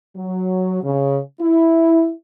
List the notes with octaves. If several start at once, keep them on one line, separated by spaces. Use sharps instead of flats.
F#3
C#3
E4